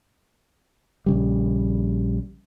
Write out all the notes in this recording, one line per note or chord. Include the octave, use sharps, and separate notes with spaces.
A#1 C#3 G3